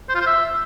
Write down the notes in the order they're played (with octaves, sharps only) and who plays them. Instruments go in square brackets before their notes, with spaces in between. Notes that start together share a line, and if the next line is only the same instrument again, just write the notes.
[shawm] C5
F4
C5
E5